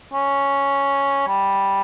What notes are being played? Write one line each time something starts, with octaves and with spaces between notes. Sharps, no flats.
C#4
G3